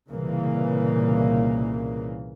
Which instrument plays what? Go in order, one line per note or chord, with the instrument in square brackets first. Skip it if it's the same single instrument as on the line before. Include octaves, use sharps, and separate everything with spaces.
[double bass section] C2 A#2 C#3 E3 A#3